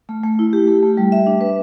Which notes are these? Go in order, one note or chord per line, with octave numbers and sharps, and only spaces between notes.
A3
A3
E4
G4
A3
A3
G3
E5
D4
B4